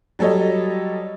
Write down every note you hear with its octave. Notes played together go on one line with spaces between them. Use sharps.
F#3 G3 A4 C#5 D#5